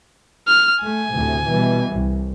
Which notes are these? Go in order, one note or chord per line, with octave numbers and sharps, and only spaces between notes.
F6
A3 G#5
D2 A2 C3
B2 E3 G3
C2